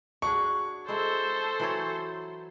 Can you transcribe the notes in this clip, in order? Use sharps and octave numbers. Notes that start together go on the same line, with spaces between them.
D4 F#4 G#4 C#6
G#3 E4 A4 C5
E3 F#3 C#5